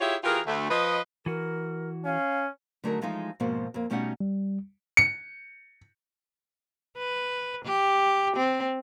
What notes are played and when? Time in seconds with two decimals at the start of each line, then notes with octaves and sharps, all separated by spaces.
0.01 E4 F4 G4 G#4 C#5 E5
0.24 E3 F4 G4 G#4 A#4
0.46 D2 A3
0.70 F3 B4 D#5
1.26 E3 F#4 A#4
2.05 C#4 F5
2.84 D3 F#3 A3 D#4 G#4 A#4
3.01 E3 F3 G#3 A3 D#4 F4
3.40 F2 G#2 B2 F3 A#3 F#4
3.74 F2 A#3
3.90 B2 G3 A3 C#4 D#4 F#5
4.20 G3
4.97 C#7
6.98 B4
7.64 G4
8.37 C4